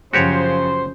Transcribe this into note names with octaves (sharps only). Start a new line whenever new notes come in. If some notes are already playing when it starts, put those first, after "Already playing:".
F#2 C#3 F3 F#4 G4 C5 C#5